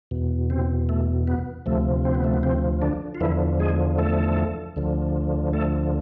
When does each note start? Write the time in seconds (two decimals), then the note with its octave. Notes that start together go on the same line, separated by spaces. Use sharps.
0.11 E2 B2
0.50 C3 C4
0.89 A3
1.28 B3
1.66 D2 C3 F3 A3
2.05 C4
2.15 B3
2.24 A3
2.34 B3
2.43 C3 C4
2.82 D3 D4
3.15 F4
3.20 E2 D3 E3 F3 E4
3.60 G#3 G#4
3.98 A3 A4
4.76 D2 D3 F3
5.53 A3 A4